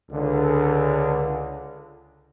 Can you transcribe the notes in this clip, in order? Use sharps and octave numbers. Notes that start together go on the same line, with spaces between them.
C#2 D3